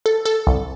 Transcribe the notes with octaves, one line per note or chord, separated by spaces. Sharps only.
A4
A4
C2